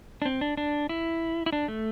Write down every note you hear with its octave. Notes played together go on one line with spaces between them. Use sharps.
D4
C4
D4
D4
E4
E4
D4
A3